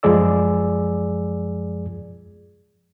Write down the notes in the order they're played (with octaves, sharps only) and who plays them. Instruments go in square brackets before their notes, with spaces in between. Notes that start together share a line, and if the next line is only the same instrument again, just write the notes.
[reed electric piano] F#2 F3 G#3 G#4 D5 E6